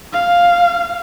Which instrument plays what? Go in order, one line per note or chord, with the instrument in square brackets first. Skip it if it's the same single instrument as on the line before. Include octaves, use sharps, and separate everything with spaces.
[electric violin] F5